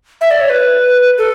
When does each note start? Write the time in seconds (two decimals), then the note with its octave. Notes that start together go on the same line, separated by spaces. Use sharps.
0.21 E5
0.31 D5
0.41 C#5
0.50 B4
1.18 A4